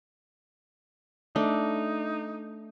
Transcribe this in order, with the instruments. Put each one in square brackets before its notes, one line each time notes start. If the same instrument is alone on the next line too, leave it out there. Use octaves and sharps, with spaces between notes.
[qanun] A3 D4 [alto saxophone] D#4